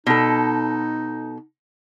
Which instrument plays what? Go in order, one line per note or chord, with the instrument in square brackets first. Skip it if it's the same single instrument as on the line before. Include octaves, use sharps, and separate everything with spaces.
[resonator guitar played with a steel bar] B2 A4 [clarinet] D#4